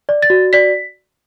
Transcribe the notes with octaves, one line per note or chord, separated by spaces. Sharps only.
D5
A6
F#4
D5 B6